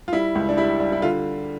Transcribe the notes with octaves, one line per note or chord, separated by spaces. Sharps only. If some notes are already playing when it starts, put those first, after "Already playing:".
F4
G3 E4
C#2
D4
G3 E4
G3
E4
D3 F4